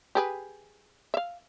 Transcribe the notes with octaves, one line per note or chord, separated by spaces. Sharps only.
G4 G#4 B4
E5 F5